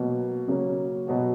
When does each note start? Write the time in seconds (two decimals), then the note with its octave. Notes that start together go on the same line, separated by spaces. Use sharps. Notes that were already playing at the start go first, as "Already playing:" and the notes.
Already playing: B2 F#3 A#3
0.47 C#3 F#3 A#3 C#4
1.07 B2 F#3 B3 F#4